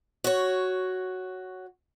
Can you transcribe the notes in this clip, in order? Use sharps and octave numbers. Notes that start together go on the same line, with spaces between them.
F#4 C#5